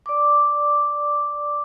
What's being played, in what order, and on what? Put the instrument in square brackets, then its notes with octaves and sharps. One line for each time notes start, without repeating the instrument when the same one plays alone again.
[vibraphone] D5 D6